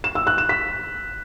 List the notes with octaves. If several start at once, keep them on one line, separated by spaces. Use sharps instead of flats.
E7
E6
F#6
E7
B6